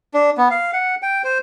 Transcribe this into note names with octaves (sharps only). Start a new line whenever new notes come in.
D4
B3
F5
F#5
G5
C5